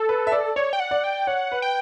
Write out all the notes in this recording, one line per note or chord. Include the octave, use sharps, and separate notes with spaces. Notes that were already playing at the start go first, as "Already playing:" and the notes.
Already playing: A4
B4
E5
D5
C#5 D5
G5
F#5
D5
G5
C#5 F#5
B4
G5